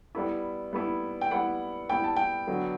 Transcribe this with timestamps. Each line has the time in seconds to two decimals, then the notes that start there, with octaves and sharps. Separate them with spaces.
0.15 G3 B3 E4
0.73 G3 B3 E4
1.21 G5
1.31 G3 B3 E4 F#5
1.90 G3 B3 E4 G5
2.04 A5
2.16 G5
2.47 D3 F#3 B3